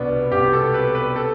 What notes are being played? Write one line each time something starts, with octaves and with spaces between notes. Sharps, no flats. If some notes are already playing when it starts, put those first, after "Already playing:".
Already playing: C2 B2 B3 D4
C2 B2 G4
A4
B4
B4
A4